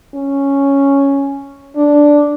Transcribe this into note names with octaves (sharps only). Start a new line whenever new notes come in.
C#4
D4